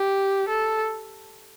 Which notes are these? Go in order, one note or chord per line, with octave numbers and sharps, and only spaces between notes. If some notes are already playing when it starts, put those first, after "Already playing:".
Already playing: G4
A4